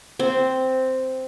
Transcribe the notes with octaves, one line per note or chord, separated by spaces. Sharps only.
C4